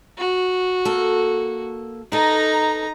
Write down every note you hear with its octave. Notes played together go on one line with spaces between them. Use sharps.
F#4
A#3 A4
D#4 A4 B4 A#5